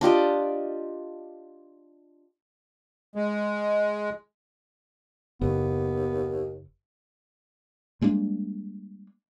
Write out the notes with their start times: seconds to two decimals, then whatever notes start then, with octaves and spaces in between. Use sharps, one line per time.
0.01 D4 F4 G4 D#5
3.16 G#3
5.41 F#1 D#2 B3
8.01 G3 G#3 A#3 D4